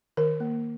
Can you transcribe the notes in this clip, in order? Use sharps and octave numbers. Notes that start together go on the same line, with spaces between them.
D#3 A#4
A#3